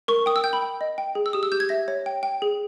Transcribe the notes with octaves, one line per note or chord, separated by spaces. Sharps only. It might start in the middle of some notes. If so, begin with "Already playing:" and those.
A#4 C#6
G5 D#6
E6
G5 G6
B5
G5
D#5
G5
G#4
E6
G4 D#6
E6
G4 G6
G#6
E5 A#6
C#5
G5
G5
G#4